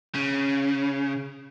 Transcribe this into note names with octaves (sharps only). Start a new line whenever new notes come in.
C#3